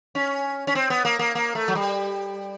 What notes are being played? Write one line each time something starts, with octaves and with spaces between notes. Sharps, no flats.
C#4
C#4
C4
B3
A#3
A#3
A#3
A3
F#3
G3